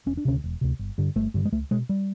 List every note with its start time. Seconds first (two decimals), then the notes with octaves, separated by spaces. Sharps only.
0.06 E1 C#4
0.17 D4
0.25 D2 C3 C#4
0.44 E1
0.61 D2 C3
0.79 G1
0.98 G2 D3
1.16 G1 A3
1.34 G2 D3
1.45 G#3
1.52 C#2 A3
1.71 B2 G#3
1.89 G3